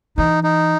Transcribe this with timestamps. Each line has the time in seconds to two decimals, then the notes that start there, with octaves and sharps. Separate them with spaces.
0.18 E3 D#4
0.44 D#4